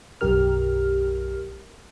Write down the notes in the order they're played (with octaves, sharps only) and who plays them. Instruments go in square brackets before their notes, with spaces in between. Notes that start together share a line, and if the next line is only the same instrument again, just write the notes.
[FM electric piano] B1 F#2 G4 A#4 F6